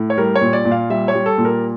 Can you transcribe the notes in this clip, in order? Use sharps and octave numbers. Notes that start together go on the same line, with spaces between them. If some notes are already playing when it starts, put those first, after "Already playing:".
Already playing: A2
C#5
G3 A#4
C#5
A#2
D5
A#2
F5
G3 E5
C#5
G3
A4
A#2
A#4